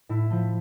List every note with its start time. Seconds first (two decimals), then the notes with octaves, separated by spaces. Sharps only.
0.09 A2 E4
0.30 F3 A3